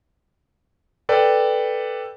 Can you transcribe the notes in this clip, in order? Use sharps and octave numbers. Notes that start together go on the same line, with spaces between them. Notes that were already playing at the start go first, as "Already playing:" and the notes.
A4 B4 D5 G5